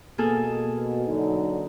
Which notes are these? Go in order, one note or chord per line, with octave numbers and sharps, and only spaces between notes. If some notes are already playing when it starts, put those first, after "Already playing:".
B2 A#3 G#4 A4
D3 F#3 D#4